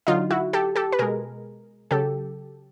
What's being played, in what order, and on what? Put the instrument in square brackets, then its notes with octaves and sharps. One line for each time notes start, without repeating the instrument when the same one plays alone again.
[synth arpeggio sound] D3 F#3 D#4 F4
E4 F#4
G4 A4
G4 A4
B4
B2 G#3 G#4 A#4
C#3 F#3 G4 A4